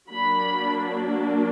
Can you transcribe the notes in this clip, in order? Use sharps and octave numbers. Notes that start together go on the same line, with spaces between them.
F#3 A#3 D4 B5